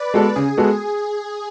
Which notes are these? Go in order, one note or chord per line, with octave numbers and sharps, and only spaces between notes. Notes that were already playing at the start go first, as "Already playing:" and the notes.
Already playing: B4 D5
G#3 B3 F#4 A4
C#3 G#4
G#3 B3 F#4 A4